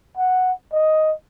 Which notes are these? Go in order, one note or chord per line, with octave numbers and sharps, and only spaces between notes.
F#5
D#5